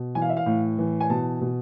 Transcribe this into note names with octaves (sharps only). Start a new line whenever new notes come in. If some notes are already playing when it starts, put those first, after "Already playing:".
Already playing: B2
E3 G#5
F5
E5
F5
A2
E3
G#5
B2 A5
B2